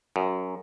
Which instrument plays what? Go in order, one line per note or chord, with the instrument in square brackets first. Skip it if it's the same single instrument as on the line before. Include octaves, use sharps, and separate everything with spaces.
[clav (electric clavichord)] F#2